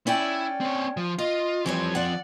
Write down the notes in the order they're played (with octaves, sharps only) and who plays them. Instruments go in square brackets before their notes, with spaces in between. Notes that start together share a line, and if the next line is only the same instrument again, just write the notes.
[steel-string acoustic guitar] C#4 D5 G5 [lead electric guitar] E4
[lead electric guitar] C4 C#5
F3
[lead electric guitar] F4 [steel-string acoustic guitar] D#5
[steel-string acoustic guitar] E3 G3 C#5 [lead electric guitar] F3 C4
[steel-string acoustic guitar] D5 F#5